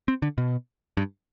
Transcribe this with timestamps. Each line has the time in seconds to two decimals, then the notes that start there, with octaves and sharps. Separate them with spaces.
0.08 C4
0.22 D3
0.38 B2
0.97 G2